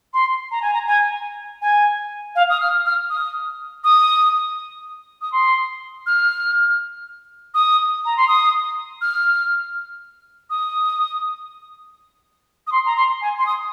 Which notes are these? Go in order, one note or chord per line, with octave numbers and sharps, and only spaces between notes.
C6
A#5
G#5
A#5
G#5
G#5
F5
D#6
F6
F6
D#6
D#6
D#6
C6
F6
D#6
A#5
C6
D#6
F6
D#6
D#6
C6
A#5
C6
G#5
C6
D#6